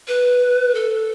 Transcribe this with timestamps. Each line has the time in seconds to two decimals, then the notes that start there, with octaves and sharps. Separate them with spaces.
0.08 B4
0.75 A4